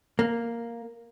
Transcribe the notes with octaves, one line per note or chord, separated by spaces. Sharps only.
A#3